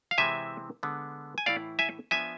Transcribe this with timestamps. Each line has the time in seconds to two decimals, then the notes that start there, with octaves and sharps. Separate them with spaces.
0.11 F5
0.18 C3 E3 G#3 C4 E4 E5 G#5
0.83 D3 G#3 B3
1.38 G#5
1.46 A2 E3 A3 E4 D5 F5
1.79 E5 G#5
2.11 F3 B3 D4 E5 G#5